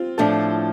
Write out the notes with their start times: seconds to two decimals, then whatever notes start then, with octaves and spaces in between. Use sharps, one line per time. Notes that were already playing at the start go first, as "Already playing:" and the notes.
Already playing: C4 F4
0.18 A2 F3 A3 D4 A4